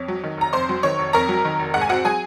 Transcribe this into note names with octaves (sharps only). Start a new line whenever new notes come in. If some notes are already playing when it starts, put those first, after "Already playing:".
Already playing: F2 C#5
F#3
D#3
F1 A#5
F2 C5 C6
F#3
D#3 C#5 C#6
F1
F2 A#4 A#5
F#3
D#3
F1
G#2 F#5
G#5
C4 F#4 F#5
F#3 G#4 G#5